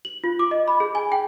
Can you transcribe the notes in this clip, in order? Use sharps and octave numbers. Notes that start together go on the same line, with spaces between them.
F#7
F4
D6
D#5
B5
G#4
G#5
G5